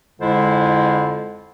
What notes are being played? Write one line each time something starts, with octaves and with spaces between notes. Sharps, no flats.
F2 D3 G#3 E4 F4 C5